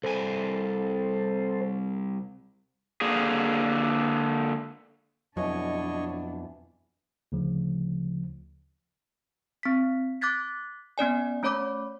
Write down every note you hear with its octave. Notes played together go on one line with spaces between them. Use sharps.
C2 A4 C5 G#5
D3 A#3 G#4
F2 B2 E3 F#3 D4 C#5 D#5 C#6
D2 C#3 F3
C4 B6
D6 F#6 G#6 A6 B6
B3 C#4 D5 G#5
A3 C#4 C#5 B5 D6 G6